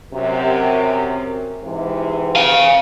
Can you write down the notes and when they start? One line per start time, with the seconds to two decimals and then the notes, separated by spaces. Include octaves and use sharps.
0.13 F#2 C3
1.64 G#2 C3 E3
2.36 F5 G#5